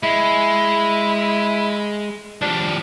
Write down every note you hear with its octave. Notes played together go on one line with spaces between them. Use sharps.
G#3 E4
F3 G3 D4